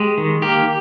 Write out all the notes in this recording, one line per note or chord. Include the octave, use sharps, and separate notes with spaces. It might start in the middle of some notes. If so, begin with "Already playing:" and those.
Already playing: G#3 G4
D#3
A#3 G4